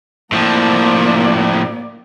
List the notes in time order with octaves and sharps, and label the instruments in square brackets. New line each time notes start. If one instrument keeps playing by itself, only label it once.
[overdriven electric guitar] A2 F3 [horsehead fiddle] A#3 D5